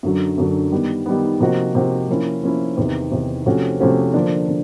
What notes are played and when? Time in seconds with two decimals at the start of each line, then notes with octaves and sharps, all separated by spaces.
0.03 F#2 D3 F#3
0.38 F#2 D3 F#3
0.72 D#3 G3 B3
1.06 D#3 G3 B3
1.40 C3 F3 A#3 D#4 F#4
1.75 C3 F3 A#3 D#4 F#4
2.09 F3 A#3 C#4 E4
2.43 F3 A#3 C#4 E4
2.77 E2 C3 D#3
3.11 E2 C3 D#3
3.46 C3 F3 A3 C#4 F#4
3.80 C3 F3 A3 C#4 F#4
4.14 D3 F3 A#3 D4
4.48 D3